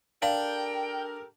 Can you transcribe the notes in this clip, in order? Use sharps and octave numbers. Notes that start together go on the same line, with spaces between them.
D4 G4 A4 A#4 F5 G5